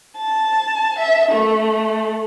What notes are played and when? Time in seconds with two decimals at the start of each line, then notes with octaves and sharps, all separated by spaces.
0.17 A5
0.97 E5
1.30 A3